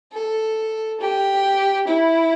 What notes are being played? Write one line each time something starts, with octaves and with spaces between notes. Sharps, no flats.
A4
G4
E4